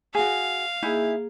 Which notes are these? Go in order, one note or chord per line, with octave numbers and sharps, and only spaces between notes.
F#4 G#4 F5
A#3 D#4 E4 G#4 G#5